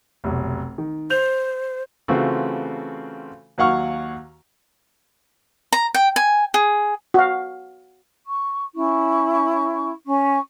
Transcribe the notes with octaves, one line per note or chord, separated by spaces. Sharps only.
F1 B1
D#3
C5 G6 F7
C#3 E3 A3 C4 F4 F#4
D#2 F#3 F5 F#5 C#6 F6
A#5
G5
G#5
G#4
F#4 F5
C#6
C#4 E4 C#6
C#4 C#6